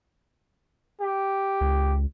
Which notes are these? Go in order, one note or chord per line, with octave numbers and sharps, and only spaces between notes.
G4
C#2